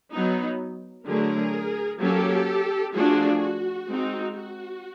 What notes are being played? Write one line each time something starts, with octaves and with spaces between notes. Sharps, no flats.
F#3 B3 D#4
D3 F#3 A3 G#4 A#4
F#3 A#3 C#4 G4 A4
F3 A3 D4 F4 F#4 G#4
F#4
G#3 C4 D#4
F#4